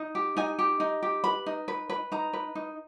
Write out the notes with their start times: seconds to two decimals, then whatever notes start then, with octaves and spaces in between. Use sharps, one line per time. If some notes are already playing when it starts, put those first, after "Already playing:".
Already playing: D#4
0.15 G4
0.37 D#4 G#5
0.59 G4
0.80 D#4
1.03 G4
1.24 B4 B5
1.46 D#4
1.68 B4
1.90 B4
2.12 D#4 A#5
2.33 B4
2.55 D#4